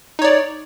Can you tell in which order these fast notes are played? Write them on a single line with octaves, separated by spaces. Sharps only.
D#4 C#5 D5